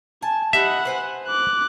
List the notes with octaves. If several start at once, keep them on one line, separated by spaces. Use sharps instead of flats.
G#5 A5
G3 D#4 E5 F#5 B5
B4 C5 G#5
D6 F#6